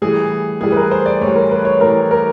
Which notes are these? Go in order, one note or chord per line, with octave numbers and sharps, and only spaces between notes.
A2 E3 G3 G#4
A2 E3 G3 G#4
B4
A#4
C5
D5
A2 E3 G3 C#5
A#4
B4
C#5
A2 E3 G3 A#4
A#4